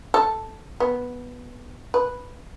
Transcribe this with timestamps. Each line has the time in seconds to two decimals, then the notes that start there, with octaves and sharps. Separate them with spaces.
0.14 A4
0.80 B3
1.94 B4